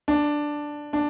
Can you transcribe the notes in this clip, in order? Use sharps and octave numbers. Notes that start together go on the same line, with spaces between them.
D4
D4